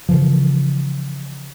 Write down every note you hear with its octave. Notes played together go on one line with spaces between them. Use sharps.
C#3 E3 F3